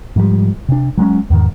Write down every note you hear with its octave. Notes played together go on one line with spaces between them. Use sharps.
G#2 F3 G3
C3 D4
F#3 G#3 C4 C#4
E2 G#2 D#3